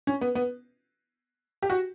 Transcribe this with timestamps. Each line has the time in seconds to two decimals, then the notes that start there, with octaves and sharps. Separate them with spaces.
0.07 C#4
0.21 B3
0.35 B3
1.62 G4
1.70 F#4